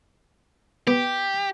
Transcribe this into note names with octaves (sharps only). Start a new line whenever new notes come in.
B3 G4